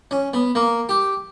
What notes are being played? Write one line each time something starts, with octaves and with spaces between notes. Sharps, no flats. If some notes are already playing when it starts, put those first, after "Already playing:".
C#4
B3
A#3
G4